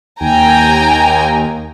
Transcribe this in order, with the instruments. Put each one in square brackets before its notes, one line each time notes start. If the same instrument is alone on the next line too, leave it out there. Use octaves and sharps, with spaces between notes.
[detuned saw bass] D#2 [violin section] G5 G#5 A#5